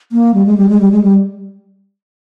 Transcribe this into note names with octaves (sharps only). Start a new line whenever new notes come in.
A#3
G3
G#3
G3
G#3
G3
G#3
G3